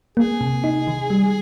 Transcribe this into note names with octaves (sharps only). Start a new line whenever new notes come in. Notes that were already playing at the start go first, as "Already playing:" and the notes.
A#3 G#4
C3
D#4
D#3
G3